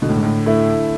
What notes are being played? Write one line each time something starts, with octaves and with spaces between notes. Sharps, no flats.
B2 D3
A2
G#2
A2
A3 E4